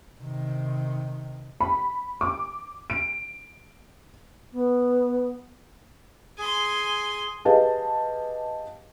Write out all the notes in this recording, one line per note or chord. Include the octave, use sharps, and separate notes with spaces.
C3 D#3
B5
D6
D7
B3
G#4 G#5 C6
G4 G#4 B4 D#5 F5 A5